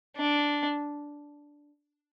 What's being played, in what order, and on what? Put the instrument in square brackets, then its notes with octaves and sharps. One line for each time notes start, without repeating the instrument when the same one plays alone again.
[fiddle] D4